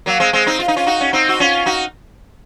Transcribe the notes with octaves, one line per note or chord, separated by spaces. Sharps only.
F#3 A#3
G#3 C4
G#3 C4
C4 D#4
F4
D#4
C#4 F4
D#4 F#4
C#4
C4 D#4
F#4
C#4 F4
D#4 F#4